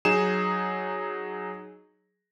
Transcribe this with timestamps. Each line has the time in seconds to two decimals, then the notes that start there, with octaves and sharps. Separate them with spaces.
0.05 F#3 D#4 G#4 E7